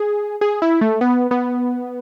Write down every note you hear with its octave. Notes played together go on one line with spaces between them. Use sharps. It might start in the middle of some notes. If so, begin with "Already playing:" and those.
Already playing: G#4
G#4
E4
A3
B3
B3